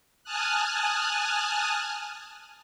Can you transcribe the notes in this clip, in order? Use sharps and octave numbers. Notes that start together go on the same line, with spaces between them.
G#5 A5 D#6 F6 F#6